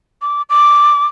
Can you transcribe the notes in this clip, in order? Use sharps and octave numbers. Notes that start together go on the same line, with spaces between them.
D6
D6